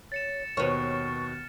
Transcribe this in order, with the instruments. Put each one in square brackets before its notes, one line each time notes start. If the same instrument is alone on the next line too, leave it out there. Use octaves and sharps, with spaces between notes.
[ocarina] C#5 [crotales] A6 C#7 E7
[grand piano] D#2 B2 [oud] B4 C#5 [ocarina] C#6 [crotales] F6